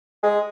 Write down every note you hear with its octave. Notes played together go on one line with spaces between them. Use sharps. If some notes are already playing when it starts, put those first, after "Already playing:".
G#3